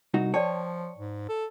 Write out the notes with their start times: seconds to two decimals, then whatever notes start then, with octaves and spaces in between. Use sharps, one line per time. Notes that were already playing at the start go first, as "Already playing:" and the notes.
0.14 C2 D#4 F#4
0.34 F3 C#5 D5 G5 A5
0.98 G#2
1.29 A4